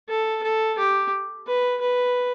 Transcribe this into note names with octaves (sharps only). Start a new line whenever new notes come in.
A4
A4
G4
B4
B4